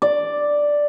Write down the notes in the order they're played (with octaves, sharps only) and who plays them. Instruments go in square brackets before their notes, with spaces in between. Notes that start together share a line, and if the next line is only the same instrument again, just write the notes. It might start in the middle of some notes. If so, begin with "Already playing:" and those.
[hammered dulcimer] D5